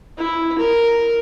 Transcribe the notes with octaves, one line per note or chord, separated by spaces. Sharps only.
E4
A#4